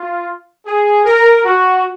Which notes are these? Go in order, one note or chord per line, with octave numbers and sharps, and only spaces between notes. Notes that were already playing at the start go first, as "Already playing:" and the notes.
Already playing: F4
G#4
A#4
F#4